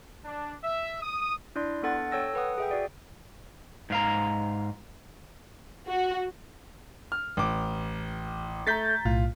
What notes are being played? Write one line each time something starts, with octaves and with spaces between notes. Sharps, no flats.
D4
E5
D#6
D4 E4 D5 C6
B3 D4 A4 F#5 A6
A4 C#5 G5 E6 A#6
A4 B4 F#5 D#6
G#4 E5 G5
F#4 D5
G#2 F5 A#5
F#4
F6
A1 D6
A3 A#5 G6 A6 B6
B1 A2 F4